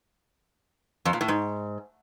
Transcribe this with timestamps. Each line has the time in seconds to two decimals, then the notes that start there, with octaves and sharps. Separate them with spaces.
1.05 F2
1.13 A#2
1.21 A2
1.28 G#2